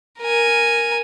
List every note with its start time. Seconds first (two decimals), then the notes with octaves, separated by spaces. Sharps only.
0.19 A#4 G#5